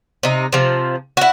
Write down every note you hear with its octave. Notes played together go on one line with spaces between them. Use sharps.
C3 D#4
C3 F3
E4 F#4